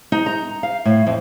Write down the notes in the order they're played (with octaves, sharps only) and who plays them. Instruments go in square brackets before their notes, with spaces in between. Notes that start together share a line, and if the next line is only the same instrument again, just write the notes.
[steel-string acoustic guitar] D#4
A#5
F5
A2
F2